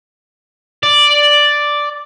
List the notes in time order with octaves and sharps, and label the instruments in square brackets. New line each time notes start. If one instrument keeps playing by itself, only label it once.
[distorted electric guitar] D5